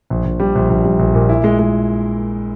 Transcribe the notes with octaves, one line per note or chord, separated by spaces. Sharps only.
A#1
A#1
G3
A#1
A#1
G3
A#1
A#2
E4
G#3
G#3